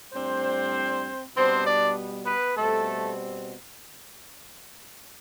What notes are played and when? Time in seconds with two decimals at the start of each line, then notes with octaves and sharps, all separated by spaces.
0.13 A2 G3 C4 D4 C5
1.35 B2 G3 B3 C4 D4 C5
1.66 D4 D5
2.26 B3 B4
2.57 B2 G3 A3 C4 A4